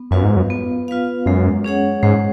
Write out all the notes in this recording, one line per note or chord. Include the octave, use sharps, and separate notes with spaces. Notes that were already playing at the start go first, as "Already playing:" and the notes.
Already playing: B3
F#2 F4 B4 F5
G#2
F#2
B3
F4 B4 F5
F#2 G#3
C#4 G#4 C#5 F#5
G#2 G#3